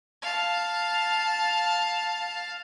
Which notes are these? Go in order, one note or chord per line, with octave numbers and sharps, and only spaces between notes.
F5 A5